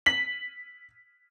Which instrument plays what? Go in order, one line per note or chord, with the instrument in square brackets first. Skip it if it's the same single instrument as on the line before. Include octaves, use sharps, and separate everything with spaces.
[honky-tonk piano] B6 F#7